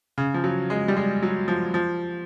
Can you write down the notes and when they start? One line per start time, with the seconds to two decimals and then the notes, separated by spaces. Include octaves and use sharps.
0.18 C#3
0.34 F3
0.44 F#3
0.70 G#3
0.88 G3
0.97 G#3
1.23 F#3
1.48 F3
1.74 F3